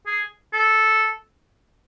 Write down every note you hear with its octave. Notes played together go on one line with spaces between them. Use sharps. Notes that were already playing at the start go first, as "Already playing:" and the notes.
G#4
A4